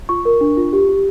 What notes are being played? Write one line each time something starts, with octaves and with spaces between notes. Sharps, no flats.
F4 C#6
A#4
D4
F4
G4
G4